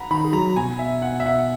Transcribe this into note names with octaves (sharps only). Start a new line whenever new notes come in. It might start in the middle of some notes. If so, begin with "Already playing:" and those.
Already playing: F#5 A#5 B5
D#3 D#4 B5
G#4
F#3 F#4 A#5
B2 B3 G#5
E5
F#5
E5
F#5